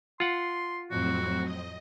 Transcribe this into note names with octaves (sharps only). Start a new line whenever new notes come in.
F4 F#5 C6
F2 A2 F#3 C4 F#4
D#5